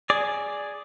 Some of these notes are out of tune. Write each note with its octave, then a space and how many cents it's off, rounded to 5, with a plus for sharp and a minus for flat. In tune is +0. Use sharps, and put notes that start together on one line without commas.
G#4 +0 D5 +0